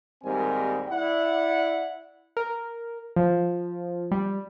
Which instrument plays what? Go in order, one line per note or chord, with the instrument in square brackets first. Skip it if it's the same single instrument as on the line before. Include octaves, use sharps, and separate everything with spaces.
[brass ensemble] D#2 G#2 G3 C4 A#4 G#5
E4 D5 F#5
[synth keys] A#4
F3
G3